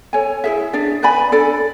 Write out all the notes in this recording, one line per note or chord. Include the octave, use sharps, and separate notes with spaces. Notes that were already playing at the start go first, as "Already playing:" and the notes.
A4 C#5 G#5
E4 G#4 C#5 E5
D4 G#4 D5
B4 D5 G#5 B5
D4 A4 D5